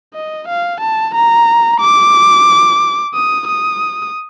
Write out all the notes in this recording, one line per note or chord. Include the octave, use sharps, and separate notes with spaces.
D#5
F5
A5
A#5
D6
D#6
D#6